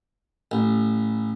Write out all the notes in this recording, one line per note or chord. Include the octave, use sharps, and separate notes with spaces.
A1